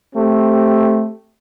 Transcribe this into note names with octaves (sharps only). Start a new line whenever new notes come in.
A3 C4 G4